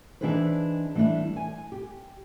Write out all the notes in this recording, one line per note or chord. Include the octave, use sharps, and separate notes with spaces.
E3 D4 D#4 G#4 B4 C5
E3 G3 A3 C4 D4
G#5
G4